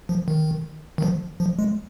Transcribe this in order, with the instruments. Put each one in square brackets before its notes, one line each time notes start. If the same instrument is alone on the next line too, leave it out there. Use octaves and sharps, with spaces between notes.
[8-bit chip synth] F3
D#3
D#3
F3
F3
G#3